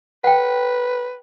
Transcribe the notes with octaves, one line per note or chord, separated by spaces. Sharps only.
B4 F#5 G5